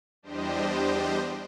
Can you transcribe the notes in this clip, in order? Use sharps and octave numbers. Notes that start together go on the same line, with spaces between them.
E2 G3 D4 G4 C5 D#5